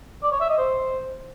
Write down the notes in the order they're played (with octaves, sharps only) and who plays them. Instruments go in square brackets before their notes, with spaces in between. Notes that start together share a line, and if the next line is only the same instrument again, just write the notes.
[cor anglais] D5
C#5
E5
D#5
C5